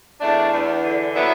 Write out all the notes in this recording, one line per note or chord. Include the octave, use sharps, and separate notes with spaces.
E2 A3 D4
E2
D3
F#3 B3 E4